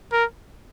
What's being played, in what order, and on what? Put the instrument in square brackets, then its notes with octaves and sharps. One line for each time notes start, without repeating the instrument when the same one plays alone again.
[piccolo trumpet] A#4